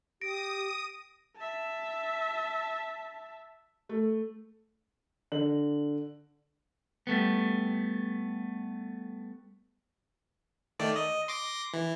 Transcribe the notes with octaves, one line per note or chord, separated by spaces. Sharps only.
G4 D#6 A#6 D7
E5 A5
A3
D3 F#7
G3 A3 B3
D#3 A3 D5
D#5
C6 D6 A#6
E3